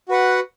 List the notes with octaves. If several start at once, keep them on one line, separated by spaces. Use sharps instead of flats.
F#4 B4 F#5